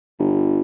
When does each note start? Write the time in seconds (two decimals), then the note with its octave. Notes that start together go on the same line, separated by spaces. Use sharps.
0.19 G1